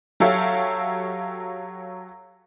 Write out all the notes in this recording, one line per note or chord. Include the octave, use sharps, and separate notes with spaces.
F#3 G4 A4 C#5 E5 F5